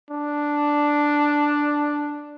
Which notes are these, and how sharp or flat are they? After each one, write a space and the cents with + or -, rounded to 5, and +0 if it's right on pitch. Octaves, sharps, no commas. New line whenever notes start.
D4 +0